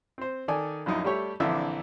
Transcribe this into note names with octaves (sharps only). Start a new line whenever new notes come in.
C4 C5
D#3 A4 D5 G#5
A#1 F#2 D#4 E4
G3 A3 G4 C#5 E5
A#1 D3 E3 C4 E5 D6